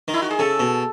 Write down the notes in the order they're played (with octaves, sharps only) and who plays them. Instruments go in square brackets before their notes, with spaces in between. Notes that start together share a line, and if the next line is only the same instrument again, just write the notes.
[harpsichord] D#3
[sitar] E4
F#4
G#4
[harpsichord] C#3 [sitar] A4
[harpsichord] B2